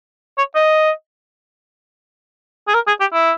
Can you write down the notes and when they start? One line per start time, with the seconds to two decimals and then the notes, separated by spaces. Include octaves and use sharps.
0.38 C#5
0.55 D#5
2.67 G#4
2.74 A#4
2.87 G#4
3.00 G4
3.13 E4